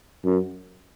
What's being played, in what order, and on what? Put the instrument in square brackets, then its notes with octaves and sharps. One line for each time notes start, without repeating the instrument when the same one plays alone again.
[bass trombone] F#2